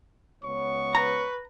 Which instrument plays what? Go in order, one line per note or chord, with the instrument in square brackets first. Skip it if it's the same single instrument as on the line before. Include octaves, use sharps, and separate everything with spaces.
[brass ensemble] C#2 B3 C#5 [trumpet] C#6
[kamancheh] B4 [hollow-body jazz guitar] A#5